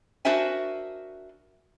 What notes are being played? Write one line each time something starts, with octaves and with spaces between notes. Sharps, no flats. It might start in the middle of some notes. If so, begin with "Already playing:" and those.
D4 F#4 A#4 C5 E5 G#5